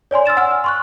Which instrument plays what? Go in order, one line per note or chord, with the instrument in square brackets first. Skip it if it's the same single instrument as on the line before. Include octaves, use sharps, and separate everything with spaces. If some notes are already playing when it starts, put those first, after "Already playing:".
[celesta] C#5 D5 G#5 C6
E6 F6 A6 E7
F#5 G#5 E6 F6
F6
C6 C#6 F#6